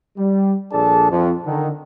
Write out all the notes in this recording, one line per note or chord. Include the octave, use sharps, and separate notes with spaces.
G3
A#1 D4 G#4 A4 D5 A5
F2
D3 D#3